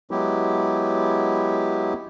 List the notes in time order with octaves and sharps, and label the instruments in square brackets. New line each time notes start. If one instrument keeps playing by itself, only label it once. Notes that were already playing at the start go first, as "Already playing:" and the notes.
[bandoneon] F#3 G#3 B3 E4 G4